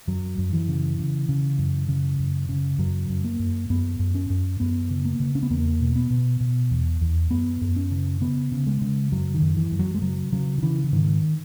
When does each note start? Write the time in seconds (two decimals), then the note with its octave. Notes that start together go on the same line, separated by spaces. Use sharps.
0.08 F#2 F#3
0.38 F#2
0.53 E3
0.68 C#3
0.98 C#3
1.29 C#3
1.58 F#2
1.89 C#3
2.19 F#2
2.49 C#3
2.78 F#2 F#3
3.09 F#2
3.24 A#3
3.39 F#2
3.70 F#2 B3
3.99 F#2
4.15 C#4
4.30 F#2
4.60 F#2 B3
4.90 C#3
5.05 A#3
5.20 C#3
5.35 C#4
5.43 B3
5.50 E2 A#3
5.80 B2
5.95 B3
6.10 B2
6.40 B2
6.71 E2
7.01 E2
7.31 F#2 B3
7.61 F#2
7.76 C#4
7.91 C#3
8.21 C#3 B3
8.52 C#3
8.67 G#3
8.81 C#3
9.12 F#2 F#3
9.34 D#3
9.42 F#2
9.57 E3
9.72 F#2
9.79 F#3
9.94 G#3
10.02 C#3 F#3
10.32 C#3 F#3
10.58 D#3
10.62 C#3 E3
10.84 E3
10.92 G#2 D#3